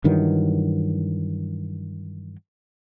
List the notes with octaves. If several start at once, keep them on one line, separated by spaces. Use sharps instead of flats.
G2 D#3 E3 F#3